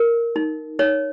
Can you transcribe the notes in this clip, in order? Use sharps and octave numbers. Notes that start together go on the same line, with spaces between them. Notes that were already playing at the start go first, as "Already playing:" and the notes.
Already playing: A#4
D#4
D#4 C#5